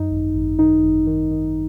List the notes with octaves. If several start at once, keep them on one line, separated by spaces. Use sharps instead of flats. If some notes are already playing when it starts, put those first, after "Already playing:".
Already playing: F#2 D#4
G#1
G#1
D#3 D#4
G#1
D#3
D#3